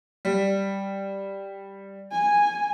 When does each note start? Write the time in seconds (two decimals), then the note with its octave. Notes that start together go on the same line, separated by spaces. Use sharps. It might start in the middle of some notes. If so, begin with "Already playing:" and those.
0.25 G3
2.12 G#5